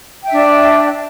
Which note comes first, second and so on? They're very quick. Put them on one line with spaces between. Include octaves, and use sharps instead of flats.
G5 E5 D4 D5